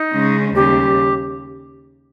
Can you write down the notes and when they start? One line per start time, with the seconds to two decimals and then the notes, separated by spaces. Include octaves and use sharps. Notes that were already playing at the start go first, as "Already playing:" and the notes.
Already playing: D#4
0.13 C#3 G#3 C#4
0.55 D#2 C#3 G3 G4